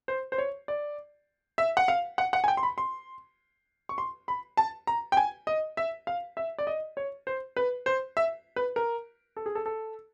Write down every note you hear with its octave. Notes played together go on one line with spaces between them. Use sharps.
C5
C5
C#5
D5
E5
F#5
F5
F#5
F#5
G#5
G5
C6
B5
C6
C#6
C6
B5
A5
A#5
G5
G#5
D#5
E5
F5
E5
D5
D#5
C#5
C5
B4
C5
E5
B4
A#4
A4
G#4
A4
A4